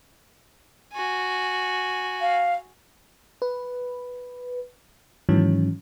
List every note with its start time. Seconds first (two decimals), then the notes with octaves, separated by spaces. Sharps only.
0.93 F#4 G#5
2.21 F5
3.42 B4
5.29 G#2 D#3 E3 F#3 C#4